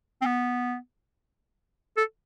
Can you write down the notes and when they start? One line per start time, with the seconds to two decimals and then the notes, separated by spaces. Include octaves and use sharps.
0.22 C4
0.25 B3
1.97 A4